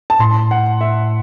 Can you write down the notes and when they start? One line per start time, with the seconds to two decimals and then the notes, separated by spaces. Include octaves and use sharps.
0.10 A5
0.19 A2 C6
0.51 F#5
0.81 E5